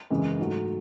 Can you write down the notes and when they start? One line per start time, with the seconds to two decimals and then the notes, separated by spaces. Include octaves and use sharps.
0.10 F#2 C#3 E3 G#3
0.39 G#2 F#3 A3